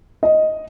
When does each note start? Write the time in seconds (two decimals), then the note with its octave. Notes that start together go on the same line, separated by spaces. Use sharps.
0.23 D#5